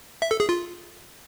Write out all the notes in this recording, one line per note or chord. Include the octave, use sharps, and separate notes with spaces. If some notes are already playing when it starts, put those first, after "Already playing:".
E5
A4
G#4
F4